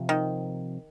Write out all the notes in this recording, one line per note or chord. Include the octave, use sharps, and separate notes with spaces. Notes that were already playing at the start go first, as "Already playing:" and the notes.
Already playing: C3 F3 C4
D#3